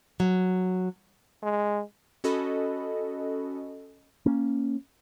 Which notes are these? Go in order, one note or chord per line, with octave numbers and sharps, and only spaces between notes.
F#3
G#3
C#4 F#4 A4 D#5 B5
A#3 C#4